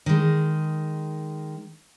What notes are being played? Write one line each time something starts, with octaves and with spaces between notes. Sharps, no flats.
D#3 G#3